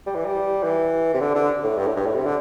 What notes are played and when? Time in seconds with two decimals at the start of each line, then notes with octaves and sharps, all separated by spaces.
0.06 G3
0.16 E3
0.25 G3
0.63 E3
1.14 C3
1.20 D3
1.35 D3
1.63 A2
1.77 G2
1.87 A2
1.96 G2
2.06 A2
2.15 C3
2.25 D3